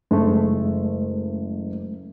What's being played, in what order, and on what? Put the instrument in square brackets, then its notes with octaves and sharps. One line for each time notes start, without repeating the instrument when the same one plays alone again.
[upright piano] F#1 [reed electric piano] G#3 A3